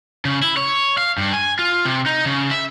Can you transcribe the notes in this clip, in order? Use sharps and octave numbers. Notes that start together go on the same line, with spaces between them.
C#3
E4
C#5
F5
G2
G#5
F4
C3
D#4
C#3
E5